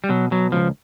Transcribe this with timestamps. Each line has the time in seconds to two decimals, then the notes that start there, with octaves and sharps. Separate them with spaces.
0.04 G3
0.09 B2 F#3
0.31 B2 F#3
0.52 C#2 F3